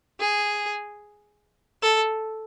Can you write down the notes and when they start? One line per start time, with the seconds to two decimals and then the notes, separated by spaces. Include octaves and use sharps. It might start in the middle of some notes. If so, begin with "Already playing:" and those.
0.20 G#4
1.82 A4